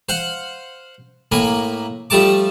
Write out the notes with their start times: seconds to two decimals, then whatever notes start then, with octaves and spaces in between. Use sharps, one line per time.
0.09 C5 F5 F#5
1.32 A2 A#3 G#5 B5
2.10 F3 G3 A3 A5 D6